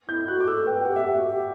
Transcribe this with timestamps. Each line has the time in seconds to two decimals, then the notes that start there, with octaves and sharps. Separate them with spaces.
0.08 E4 G6
0.28 F#4 F#6
0.40 D6
0.47 A4 E6
0.66 B4 G5
0.80 G5
0.85 G4 F#5
0.96 E5
1.04 G4 F#5
1.18 F#4
1.25 G4